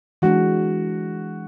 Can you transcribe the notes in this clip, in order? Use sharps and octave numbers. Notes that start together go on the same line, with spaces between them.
E3 G#3 D4 F#4